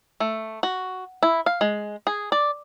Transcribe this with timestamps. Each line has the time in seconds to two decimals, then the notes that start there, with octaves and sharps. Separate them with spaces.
0.20 A3
0.63 F#4
1.23 E4
1.46 F5
1.61 G#3
2.07 G#4
2.32 D5